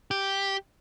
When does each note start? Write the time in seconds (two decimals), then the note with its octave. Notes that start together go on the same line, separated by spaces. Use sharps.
0.11 G4